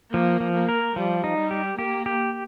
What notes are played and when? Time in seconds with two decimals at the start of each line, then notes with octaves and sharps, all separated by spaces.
0.13 F3 A#3
0.40 F3
0.55 A#3
0.69 A#4
0.96 F3 G3
1.24 D#4
1.37 G3
1.51 G4
1.78 A#3 G4
2.06 G4